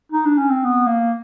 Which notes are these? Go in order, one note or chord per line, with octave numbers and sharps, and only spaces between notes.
D#4
D4
C#4
C4
B3
A#3